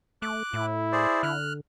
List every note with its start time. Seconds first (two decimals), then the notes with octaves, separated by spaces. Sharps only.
0.22 A3 D6 F#6
0.53 A2 E4
0.92 G#4 C5 D5
1.23 D3 F6 F#6